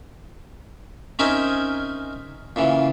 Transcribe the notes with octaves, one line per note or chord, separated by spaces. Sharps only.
C4 C#4 D#4 G#4 A#4 E5
A#2 C#3 E3